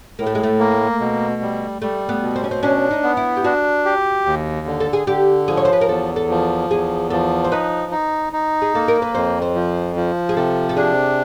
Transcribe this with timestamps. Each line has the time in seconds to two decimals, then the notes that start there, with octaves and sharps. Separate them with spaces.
0.19 A2 A#3
0.26 A3
0.35 G#3
0.43 A3
0.59 A#3
1.00 B2
1.42 G3
1.82 G3 A3
2.09 B3
2.22 B2
2.36 C4
2.44 C#4
2.51 C4
2.63 C#4 D4
2.91 D#4
3.03 B3
3.17 E4
3.37 G4
3.44 D4 F#4
3.85 G4
4.26 D#2
4.66 D3
4.80 A4
4.93 G#4
5.07 D3 G4
5.48 F3 G#4
5.57 C#5
5.65 C5
5.73 B4
5.81 A#4
5.88 E2 A4
6.16 A4
6.30 F3
6.70 E2 G#4
7.10 F3 A4
7.44 C5
7.52 D#4 B4
7.92 D#4
8.33 D#4
8.62 G#4
8.74 A#3 A4
8.88 A#4
9.02 B4
9.15 F2 C5
9.42 C5
9.55 F3
9.96 F3
10.29 G#4
10.37 C3 A4
10.69 A4
10.77 D4 G#4